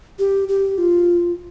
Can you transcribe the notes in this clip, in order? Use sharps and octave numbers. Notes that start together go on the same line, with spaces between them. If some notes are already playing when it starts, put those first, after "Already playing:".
G4
G4
F4